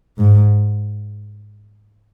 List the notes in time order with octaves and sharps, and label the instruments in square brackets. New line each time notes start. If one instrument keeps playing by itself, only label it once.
[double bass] G#2